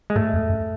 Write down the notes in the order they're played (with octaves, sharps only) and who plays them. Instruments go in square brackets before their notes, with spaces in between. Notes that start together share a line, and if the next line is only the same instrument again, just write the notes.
[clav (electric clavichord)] G#3
[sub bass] G#2 [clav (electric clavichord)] A3
[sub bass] F2
F#2